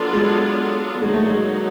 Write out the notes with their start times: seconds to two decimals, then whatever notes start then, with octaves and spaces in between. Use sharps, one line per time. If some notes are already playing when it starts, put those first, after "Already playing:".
Already playing: F#3 B3 D4 F4 A4
0.13 G#3
1.02 D3 F#3 G#3 A#3 D#4 F#4
1.14 A3
1.27 G#3